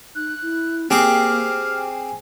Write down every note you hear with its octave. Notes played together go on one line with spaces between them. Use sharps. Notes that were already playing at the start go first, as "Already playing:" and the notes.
D#4 F#6
E4
A#3 C4 G4 G#4 D6 F6
G#5